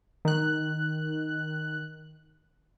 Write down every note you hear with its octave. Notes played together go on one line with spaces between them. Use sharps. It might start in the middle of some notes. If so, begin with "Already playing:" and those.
D#3 F#6